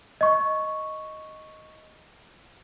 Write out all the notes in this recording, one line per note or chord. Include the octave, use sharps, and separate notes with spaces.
D#5 C#6